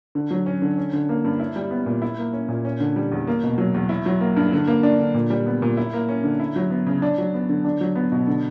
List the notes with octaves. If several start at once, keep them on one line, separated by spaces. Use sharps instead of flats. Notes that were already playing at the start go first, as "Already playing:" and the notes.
D3
F#3
C#4
D3
C#4
D3
A#3
G2
E4
G3
B3
A#2
E4
A#3
C#4
A#2
C#4
D3
G3
E2
A#3
B2
F#3
E2
E4
F#3
A#3
G2
D3
A#3
D4
D3
A#2
G3
B3
A#2
E4
A#3
C#4
D3
E4
F#3
B3
C#3
D4
F#3
B3
D3
D4
F#3
B3
B2
D3